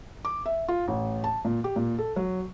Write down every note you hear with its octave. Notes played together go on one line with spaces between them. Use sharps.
D6
E5
F4
A1
A5
A#2
G4
A#2
A4
F#3